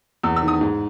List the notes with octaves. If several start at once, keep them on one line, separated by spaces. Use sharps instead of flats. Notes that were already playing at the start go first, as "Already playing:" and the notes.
E2 E6
E6
D#3
D#6
G#2